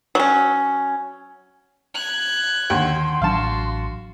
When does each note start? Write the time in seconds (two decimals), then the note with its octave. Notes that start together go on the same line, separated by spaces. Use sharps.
0.15 F#3 C#4
1.94 F#6 G#6
2.70 D#2 D3 C6
3.22 A1 F#3 D4 F#4 F5 A5